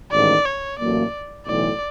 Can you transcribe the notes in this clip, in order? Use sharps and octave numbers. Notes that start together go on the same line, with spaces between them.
A1 G#2 D#3 D5
C#5
A1 A2 F#3 A#3 D5
B1 A2 E3 D5